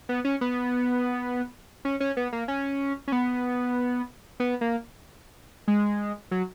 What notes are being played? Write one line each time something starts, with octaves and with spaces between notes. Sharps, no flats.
B3
C#4
B3
C#4
C#4
B3
A#3
C#4
C#4
B3
B3
A#3
G#3
F#3